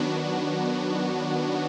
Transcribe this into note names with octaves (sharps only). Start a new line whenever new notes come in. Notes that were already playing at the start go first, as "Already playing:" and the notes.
Already playing: D#3 F#3 B3 D4 F#4